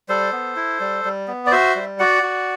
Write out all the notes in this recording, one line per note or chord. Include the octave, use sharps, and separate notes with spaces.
G3 A4 C5
B3
E4
G3
G3
B3
D5
F#4 C5 E5
G3
F#4 D5 F#5
F#4